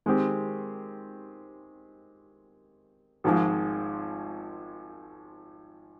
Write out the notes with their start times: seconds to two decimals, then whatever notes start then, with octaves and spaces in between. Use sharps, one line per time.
0.06 D#3 G#3 C4 G4
3.24 G#1 G#2 F3 G#3